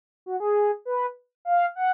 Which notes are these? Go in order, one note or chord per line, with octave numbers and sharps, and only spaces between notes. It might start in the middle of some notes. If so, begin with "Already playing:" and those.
F#4
G#4
B4
F5
F#5